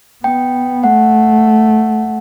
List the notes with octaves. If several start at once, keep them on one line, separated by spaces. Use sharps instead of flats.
B3 G5
A3 F#5